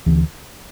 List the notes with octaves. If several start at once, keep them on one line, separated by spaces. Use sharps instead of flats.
D2 D3 E3